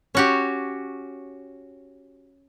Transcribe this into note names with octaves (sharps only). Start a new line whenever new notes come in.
C#4 F#4 G4